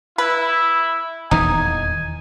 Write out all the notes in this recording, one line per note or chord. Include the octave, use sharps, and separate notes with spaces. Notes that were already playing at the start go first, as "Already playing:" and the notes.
E4 B4
D#1 E2 E3 D#4 G#5